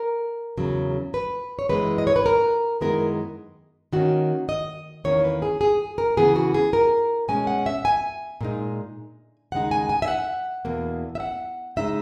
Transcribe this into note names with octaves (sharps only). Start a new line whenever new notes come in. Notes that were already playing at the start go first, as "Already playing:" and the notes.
Already playing: A#4
E2 C#3 F#3
B4
C#5
F#2 E3 G#3 B3 E4 B4
D#5
C#5
B4
A#4
F#2 D#3 G#3 B3 E4 A#4
D#3 A#3 C#4 F#4
D#5
E2 D#3 A#3 C#4 E4 C#5
B4
G#4
G#4
A#4
C#3 E3 B3 G#4
F#4
G#4
A#4
B2 G#3 C#4 G#5
F#5
E5
G#5
A#2 G#3 D#4
D#2 C#3 G#3 D#4 F#5
G#5
G#5
E5
F#5
E2 B2 A#3
E5
F#5
C#3 G#3 D#4 E5